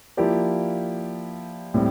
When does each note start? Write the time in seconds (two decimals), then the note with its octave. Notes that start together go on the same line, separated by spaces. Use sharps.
0.17 F3 A#3 E4 G4 D5
1.74 A2 G3 C4